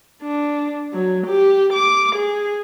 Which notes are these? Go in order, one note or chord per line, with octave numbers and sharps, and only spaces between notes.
D4
F#3
G4
D6
G#4